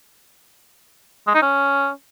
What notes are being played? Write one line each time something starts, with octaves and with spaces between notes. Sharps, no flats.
G#3
D#4
C#4